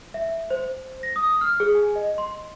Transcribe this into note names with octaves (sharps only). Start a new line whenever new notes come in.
E5
C5
A#6
D#6
F6
G#4
G#5
D#5
C6